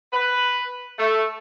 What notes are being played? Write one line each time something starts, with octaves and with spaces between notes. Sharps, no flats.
B4
A3